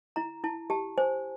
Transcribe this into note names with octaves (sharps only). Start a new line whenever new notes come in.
E4 A#5
E4 A5
G4 A5
C5 G#5